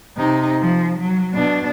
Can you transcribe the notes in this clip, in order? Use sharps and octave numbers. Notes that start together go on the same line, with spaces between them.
C3 D#4
F3
F#3
B2 D4